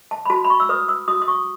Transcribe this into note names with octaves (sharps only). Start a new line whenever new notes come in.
A5
B5
F#4 A5
B5
C#6
E6
B4 D#6
E6
F#4 D#6
D#6
C#6